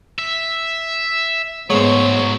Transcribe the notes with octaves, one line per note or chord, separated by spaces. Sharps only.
E5
G#2 F#3 G#3 A3 B3 C5 C#5